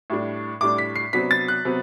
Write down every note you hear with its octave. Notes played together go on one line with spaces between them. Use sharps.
A2 G3 D4
A2 G3 D4 D6
B6
C7
C3 F#3 B3 D4 B6
A6
F#6
C3 F#3 B3